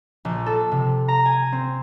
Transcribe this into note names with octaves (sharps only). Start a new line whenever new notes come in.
A#1
A4
C3
A#5
G#5
C4